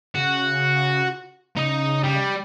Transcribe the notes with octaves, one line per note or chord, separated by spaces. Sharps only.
C#3 F#4
C#3 D#4 D#5
G3